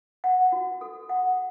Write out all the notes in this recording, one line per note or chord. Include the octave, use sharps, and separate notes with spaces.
F#5
F#4
A4
F#5